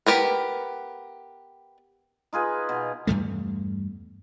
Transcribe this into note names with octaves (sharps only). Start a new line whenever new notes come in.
B3 G4 A#4 B4
D#4 F4 G#4 B4
B2
E2 G2 G3 A3